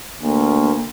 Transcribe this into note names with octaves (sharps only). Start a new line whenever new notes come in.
D2 A#3